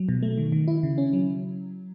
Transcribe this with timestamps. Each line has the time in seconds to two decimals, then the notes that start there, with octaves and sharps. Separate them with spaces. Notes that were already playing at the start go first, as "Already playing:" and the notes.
Already playing: F#3
0.09 B2
0.23 A3
0.38 D#3
0.52 D#3
0.68 E4
0.83 C#3
0.98 C#4
1.13 F#3